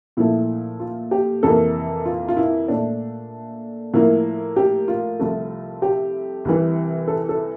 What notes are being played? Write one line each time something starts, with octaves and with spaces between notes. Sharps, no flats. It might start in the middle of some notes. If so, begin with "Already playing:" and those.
A#2 F3 A3 E4
F4
G4
F2 C3 E3 A#3 A4
F4
F4
E4
A#2 A3 D4
A2 F3 A#3 E4
G4
F4
C2 C3 F3 A3
G4
C2 C3 E3
A4
A4